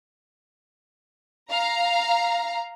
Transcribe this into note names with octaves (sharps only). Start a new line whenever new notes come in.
F5 A#5